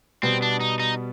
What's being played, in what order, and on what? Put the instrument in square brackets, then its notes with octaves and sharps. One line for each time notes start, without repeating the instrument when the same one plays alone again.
[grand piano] B2 G3 B3 [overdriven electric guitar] C4
[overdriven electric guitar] D4
D#4
D#4